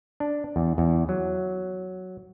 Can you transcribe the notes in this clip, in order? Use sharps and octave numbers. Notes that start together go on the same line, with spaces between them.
D4
E2
E2
F#3